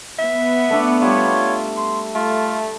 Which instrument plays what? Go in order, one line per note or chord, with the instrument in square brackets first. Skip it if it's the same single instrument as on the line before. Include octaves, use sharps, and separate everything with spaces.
[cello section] B3 [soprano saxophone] E5
[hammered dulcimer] A3 D4 D6 [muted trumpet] A4
[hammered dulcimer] G3 F#5 C#6 [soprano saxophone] F4 [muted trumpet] C#5
[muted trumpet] C6
[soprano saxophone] A3 [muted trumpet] F4